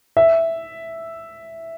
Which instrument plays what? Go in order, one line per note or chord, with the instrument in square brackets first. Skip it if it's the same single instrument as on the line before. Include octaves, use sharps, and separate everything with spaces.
[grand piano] E5